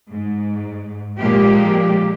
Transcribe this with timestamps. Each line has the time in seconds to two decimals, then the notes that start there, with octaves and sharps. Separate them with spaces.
0.11 G#2
1.18 A#2 F3 G#3 A#3 G4